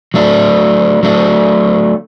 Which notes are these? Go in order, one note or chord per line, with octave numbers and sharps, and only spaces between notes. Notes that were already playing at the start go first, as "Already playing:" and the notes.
F#3 A3 D4
F#3 A3 D4